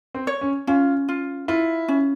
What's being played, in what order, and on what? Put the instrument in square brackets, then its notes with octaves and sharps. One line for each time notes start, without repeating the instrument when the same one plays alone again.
[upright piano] C4
[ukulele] C#5
[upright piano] C#4
[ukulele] C#4 [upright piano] F4
[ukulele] F4
[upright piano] E4 [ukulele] F4
[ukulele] C#4